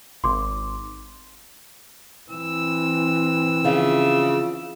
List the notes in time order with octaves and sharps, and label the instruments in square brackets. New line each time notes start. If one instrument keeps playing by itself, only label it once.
[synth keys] G#1 [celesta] C6 D6
[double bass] E3 C4 [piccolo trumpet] E6
[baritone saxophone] C#3 [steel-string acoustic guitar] F3 F4 E5